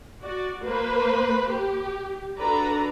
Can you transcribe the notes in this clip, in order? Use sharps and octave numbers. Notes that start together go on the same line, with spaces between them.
F#4 D5
A#3 B4 C5
G4
D4 F#4 A4 B4 D5 A#5